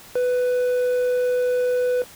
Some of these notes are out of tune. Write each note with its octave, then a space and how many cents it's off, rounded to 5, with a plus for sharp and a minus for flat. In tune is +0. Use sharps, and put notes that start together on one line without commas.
B4 +10